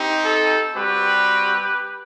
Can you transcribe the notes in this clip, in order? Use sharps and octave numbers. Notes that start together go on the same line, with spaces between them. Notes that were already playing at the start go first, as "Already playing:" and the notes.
Already playing: C4 D#4 G4
A4
G3 C4 F#4 G4 B4